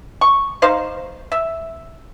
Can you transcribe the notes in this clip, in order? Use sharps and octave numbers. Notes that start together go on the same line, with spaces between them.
C#6
D#4 C5 F5
E5